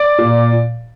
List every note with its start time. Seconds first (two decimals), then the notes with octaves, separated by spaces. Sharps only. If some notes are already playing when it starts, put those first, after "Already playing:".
Already playing: D5
0.18 A#2